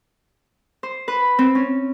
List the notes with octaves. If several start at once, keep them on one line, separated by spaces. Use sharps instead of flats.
C5
B4
C4
C#4